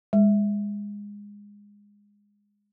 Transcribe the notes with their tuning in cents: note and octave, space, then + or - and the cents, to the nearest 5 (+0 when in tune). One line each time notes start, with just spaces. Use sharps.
G#3 -20